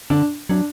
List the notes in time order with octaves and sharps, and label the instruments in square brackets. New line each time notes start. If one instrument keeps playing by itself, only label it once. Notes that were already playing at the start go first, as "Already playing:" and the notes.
[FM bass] D3 [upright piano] D4
[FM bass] F#3 [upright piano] D4